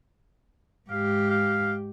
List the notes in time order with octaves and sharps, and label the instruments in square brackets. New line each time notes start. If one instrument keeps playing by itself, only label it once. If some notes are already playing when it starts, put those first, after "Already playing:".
[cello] G#2 G4 [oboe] F5
[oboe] F5